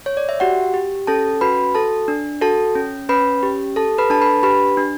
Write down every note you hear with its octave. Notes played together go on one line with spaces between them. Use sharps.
C#5
D5
E5
F#4 G4 F#5
G4
C#4 A4 A5
F#4 B4 B5
A4 A5
D4
F#4 A4 A5
C#4
C#4 B4 B5
G4
A4 A5
B4 B5
D4 A5
B4 B5
G4 B4 B5
D4